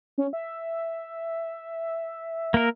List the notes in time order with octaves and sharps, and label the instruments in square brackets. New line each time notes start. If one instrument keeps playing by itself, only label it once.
[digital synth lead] C#4
E5
[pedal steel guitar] A#3 A#4